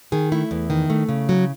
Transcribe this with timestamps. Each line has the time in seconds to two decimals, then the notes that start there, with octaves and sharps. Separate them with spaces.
0.12 D#3 G#4
0.32 A3 E4
0.51 E2
0.70 D#3
0.90 A3
1.09 C#3
1.29 F#3